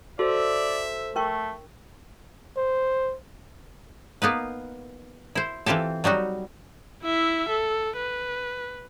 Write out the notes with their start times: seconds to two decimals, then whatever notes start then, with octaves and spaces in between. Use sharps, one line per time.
0.19 F#4 A4 C5 D5 E5
1.16 A3 A#4 G5 C#6
2.57 C5
4.22 A#3 B3 D#4 B4
5.35 E4 C5
5.66 E3 C4 F4 G4 A4
6.04 F#3 G3 D#4 F#4
7.03 E4 E5
7.49 A4
7.97 B4